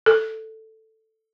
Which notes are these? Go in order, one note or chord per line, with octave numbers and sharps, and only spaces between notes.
A4